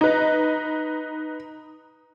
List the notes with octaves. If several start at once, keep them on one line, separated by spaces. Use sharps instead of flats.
D#4 B4